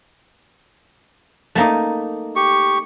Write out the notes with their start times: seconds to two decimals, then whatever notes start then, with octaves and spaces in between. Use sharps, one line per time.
1.55 A3 A#3 D#4
2.36 G4 C#6